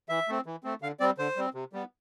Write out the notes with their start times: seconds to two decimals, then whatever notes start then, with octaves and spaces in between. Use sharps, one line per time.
0.09 E3 E5
0.28 A3 C4
0.46 E3
0.64 A3 C4
0.82 D3 F5
1.00 G3 C4 D5
1.18 D3 C5
1.36 G3 C4
1.54 C3
1.73 G3 B3